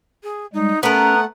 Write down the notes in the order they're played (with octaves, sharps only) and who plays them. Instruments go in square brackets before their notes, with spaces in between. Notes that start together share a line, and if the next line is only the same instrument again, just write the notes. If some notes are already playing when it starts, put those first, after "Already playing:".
[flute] G#4
[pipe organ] G3 G#3 [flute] D#4
[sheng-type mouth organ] A3 F#5 [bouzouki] B3 A#4 [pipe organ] C#4 A#5 [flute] F#6